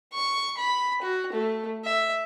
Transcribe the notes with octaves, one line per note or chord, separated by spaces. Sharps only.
C#6
B5
F#4
A3
E5